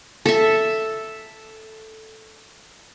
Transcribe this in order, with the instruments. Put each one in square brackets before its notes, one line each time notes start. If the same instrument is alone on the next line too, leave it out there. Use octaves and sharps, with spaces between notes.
[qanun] A4 E5